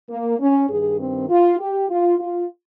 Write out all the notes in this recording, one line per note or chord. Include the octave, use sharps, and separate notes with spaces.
A#3
C#4
G2 D#3 G#4
C4
F4
G4
F4
F4